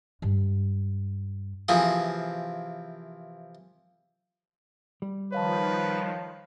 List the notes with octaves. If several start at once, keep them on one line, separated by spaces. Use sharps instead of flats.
G2 G#3
C3 E3 F3 A#3 G#4
G3
D#3 F3 B4 C#5 F5 A5